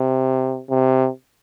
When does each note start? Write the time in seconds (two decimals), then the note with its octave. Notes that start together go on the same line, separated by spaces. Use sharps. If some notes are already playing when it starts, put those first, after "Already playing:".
Already playing: C3
0.70 C3